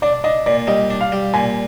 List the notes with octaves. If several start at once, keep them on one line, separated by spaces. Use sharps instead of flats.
D4 D5
D4 D#5
A#2 D5
G3 D#5
D4
F5
G3
A#2 G#5